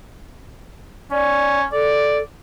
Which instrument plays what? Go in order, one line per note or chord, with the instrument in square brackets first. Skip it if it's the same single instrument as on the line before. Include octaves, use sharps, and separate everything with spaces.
[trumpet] C#4 [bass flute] D5
[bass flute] A4 [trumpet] D5